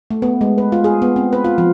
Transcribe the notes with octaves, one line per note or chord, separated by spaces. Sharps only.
A3
B3
G#3
B4
F4
G#4
B3
C4
B4
F4
F3